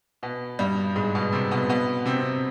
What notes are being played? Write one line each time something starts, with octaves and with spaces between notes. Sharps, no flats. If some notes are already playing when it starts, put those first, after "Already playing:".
B2 B3
G2 G3
G#2 G#3
B2 B3
C3 C4
B2 B3
B2 B3
C3 C4